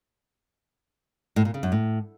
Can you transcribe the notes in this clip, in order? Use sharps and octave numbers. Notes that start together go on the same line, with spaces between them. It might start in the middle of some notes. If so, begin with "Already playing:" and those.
A2
A#2
C#3
F#2
A2